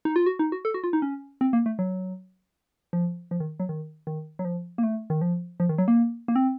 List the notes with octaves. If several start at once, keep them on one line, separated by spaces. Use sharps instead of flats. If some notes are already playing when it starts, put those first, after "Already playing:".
D#4
F4
F#4
D#4
F#4
A4
F#4
F4
D#4
C#4
C4
A#3
A3
F#3
F3
F3
D#3
F#3
D#3
D#3
F#3
F3
A#3
A3
D#3
F3
F3
D#3
F#3
A#3
A#3
C4